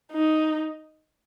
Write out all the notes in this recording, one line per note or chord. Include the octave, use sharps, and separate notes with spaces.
D#4